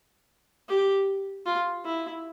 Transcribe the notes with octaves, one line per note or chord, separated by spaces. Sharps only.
G4
F4
E4